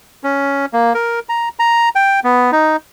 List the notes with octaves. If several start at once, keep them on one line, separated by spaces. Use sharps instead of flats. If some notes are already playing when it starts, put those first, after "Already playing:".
C#4
A#3
A#4
A#5
A#5
G5
B3
D#4